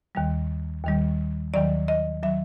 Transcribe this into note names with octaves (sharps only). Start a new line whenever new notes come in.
D#2 D#3 G3
D#2 D#3 G3
D#2 D#3 F#3 D5
D#5
D#3 F#3 E5